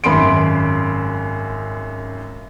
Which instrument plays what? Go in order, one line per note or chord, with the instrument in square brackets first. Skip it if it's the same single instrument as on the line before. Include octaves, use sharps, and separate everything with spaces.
[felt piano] G#1 F#2 B5 C6 D7